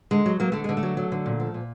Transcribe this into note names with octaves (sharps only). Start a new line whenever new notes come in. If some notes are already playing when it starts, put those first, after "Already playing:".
D3 G#3
F#3
F#3 A#3
D3 A3
D3 G#3
A3
F#3
F#3
D3
A#2
F3
A#2